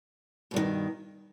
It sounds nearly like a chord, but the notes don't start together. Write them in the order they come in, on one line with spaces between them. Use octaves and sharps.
B2 G2 D#3